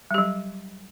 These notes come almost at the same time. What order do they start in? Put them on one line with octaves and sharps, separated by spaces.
G3 G4 F#3